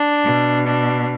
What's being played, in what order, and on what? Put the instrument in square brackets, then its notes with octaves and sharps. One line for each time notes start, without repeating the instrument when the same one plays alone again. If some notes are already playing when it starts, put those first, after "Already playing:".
Already playing: [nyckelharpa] D4
[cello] B2
[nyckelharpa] D4